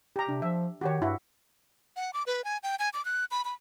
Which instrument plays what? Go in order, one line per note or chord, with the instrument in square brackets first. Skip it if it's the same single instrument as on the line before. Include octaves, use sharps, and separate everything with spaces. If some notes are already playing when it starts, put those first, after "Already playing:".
[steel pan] G4 A#5
[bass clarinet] C3 [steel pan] D4
[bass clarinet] F3 [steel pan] E5
[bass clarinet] D#3 [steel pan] F#4 G4 C#5
[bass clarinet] G2 [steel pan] E4 F#4
[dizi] F#5
D6
B4
G#5
G5
G#5
D6
F#6
B5
B5